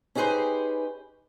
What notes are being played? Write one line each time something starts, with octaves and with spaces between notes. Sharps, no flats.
C#4 D#4 G4 G#4 B4 C5